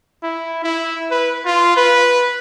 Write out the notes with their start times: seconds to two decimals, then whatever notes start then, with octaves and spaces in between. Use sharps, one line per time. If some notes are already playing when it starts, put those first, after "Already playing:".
0.23 E4
0.64 E4
1.11 B4
1.46 F4
1.77 B4